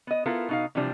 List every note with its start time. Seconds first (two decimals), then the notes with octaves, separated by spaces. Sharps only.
0.07 B3 D#5
0.26 B3 E4 F4 A4 A#4
0.49 B2 D#4 F5
0.75 C3 E3 F3 G3 D4